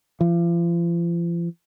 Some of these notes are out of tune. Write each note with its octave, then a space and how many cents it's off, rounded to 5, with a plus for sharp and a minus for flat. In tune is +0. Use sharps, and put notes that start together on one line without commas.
F3 -40